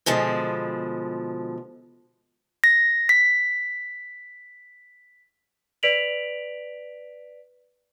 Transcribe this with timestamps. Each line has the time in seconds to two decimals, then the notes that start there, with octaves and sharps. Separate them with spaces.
0.06 B2 D3 F3 G#3
2.64 A#6
3.09 B6
5.83 B4 D5 B6 D7 F7 F#7